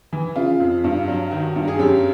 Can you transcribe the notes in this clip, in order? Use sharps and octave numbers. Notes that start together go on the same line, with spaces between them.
E3
C#3 F4
F2
G2
F#3
D#3 F#4
G2
G#4
F#2 G4